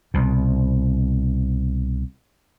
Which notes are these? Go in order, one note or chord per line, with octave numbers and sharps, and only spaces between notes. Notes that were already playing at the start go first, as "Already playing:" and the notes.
C2 B2